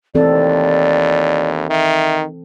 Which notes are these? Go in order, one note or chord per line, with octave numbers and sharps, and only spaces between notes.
D#2 E3 C4 A4 D5
D#3 E5